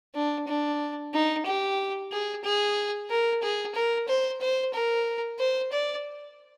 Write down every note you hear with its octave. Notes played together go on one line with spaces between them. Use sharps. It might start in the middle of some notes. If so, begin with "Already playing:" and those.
D4
D4
D#4
G4
G#4
G#4
A#4
G#4
A#4
C5
C5
A#4
C5
D5